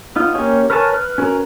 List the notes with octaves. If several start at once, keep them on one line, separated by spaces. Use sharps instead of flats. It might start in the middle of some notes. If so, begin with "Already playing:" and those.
B3 D#4 F4
A#3 C#4 G4 C#5 G#5
A#4 B4 C#5 G#5 A5
B4 F6
C#4 F#4 A#4 B4 A#5